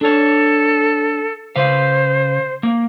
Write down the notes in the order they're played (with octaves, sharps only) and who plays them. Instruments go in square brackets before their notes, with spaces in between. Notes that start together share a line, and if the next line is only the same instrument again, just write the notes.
[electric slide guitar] D4 C#5 [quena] A4
[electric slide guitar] C#3 B4 F5 [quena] C5
[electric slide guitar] A#3